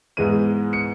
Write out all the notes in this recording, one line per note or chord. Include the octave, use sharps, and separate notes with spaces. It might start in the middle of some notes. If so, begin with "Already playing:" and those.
G#2 E3 G#3 B3 D#7
C#7